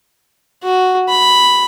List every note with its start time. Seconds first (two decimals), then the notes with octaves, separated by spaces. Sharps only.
0.63 F#4
1.09 B5